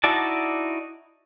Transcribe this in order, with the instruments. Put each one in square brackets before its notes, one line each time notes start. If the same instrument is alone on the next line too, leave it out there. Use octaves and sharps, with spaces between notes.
[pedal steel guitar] D#4 E4 F#4 D5 A5